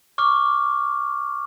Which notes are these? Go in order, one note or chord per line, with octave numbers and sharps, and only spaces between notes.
C#6 D6 F6